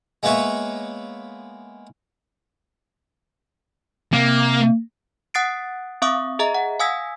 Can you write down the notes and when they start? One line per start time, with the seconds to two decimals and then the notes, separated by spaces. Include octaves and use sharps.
0.23 G#3 A#3 B3 B4 C#5 E5
4.13 C3 A#3
5.34 F#5 D#6 F#6 A6 C7 D7
6.02 C4 E5 F5 C#6 D#6
6.39 G#4 D#5 E5 A#5
6.55 F#5
6.80 F5 G#5 D#6 E6 G#6 B6